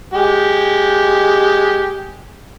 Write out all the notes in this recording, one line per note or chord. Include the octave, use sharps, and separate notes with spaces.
G#3 G4